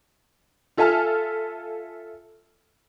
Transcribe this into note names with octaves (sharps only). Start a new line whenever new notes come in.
F4 A4 E5 G#5 A5 F6